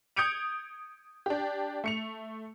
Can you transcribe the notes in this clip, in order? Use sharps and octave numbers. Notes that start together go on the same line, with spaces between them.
D#6 G6 G#6 C#7 D7 F7
D4 G4
A3 C#7 F7